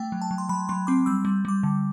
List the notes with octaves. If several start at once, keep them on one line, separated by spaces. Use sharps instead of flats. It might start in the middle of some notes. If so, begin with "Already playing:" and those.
Already playing: A3 G5
F#3
A5
F#3
C6
F#3 B5
F#3 C6
C4 D6
G3 E6
G3
G3 D6
D3